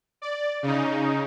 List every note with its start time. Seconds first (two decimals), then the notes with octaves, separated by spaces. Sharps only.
0.22 D5
0.63 C#3 D#4